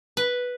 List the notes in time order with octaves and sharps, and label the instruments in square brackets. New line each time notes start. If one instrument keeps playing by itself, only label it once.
[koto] B4